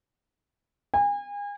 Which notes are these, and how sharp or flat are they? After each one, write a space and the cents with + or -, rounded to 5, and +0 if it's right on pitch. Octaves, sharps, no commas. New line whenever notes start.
G#5 -35